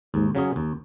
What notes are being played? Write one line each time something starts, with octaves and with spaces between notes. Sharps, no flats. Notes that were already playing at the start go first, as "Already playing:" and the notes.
D#2 G#2
C#3 F#3 C#4 G#4
D#2